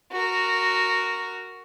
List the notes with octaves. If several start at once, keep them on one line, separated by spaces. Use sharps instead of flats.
F#4 A#4